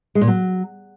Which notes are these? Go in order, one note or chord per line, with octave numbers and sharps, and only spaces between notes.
G#3
A#2
F#3